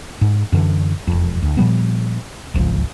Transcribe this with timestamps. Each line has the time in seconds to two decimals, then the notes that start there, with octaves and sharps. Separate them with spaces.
0.21 G#2
0.52 F#2 D3 E3
1.07 E1 F2
1.42 D2
1.57 A#2 F3 G3 B3
2.54 D1 G#1 C#2 F3